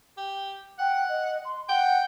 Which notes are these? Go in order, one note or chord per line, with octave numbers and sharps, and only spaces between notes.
G4
F#5 G5
D#5
C6
F#5 G5